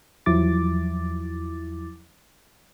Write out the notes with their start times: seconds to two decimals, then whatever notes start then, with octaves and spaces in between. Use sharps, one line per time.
0.26 E2 F3 F#3 E4 D6 A6